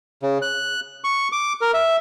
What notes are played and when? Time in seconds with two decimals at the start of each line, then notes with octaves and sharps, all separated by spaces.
0.23 C#3
0.42 F#6
1.04 C#6
1.32 D6
1.61 A#4
1.74 E5